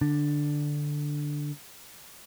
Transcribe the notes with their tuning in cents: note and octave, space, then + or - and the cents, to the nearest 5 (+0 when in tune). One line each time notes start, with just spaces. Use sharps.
D3 +5 D4 +0